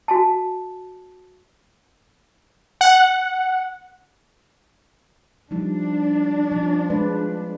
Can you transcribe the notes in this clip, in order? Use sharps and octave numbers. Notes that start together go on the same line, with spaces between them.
F#4 G#5 A5
F#5
F3 G3 D4 D#4
F3
G#3 B4 D5